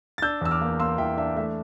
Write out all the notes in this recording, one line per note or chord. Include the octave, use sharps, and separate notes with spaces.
A6
D4 E6 G6
E2 E6
D6 F6
A#3
A#3 C6 E6
E3 E5 G5
D4 E5
A3 E5